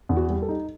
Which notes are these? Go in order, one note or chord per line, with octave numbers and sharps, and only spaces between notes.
E2
F#4
G3
A4
D#4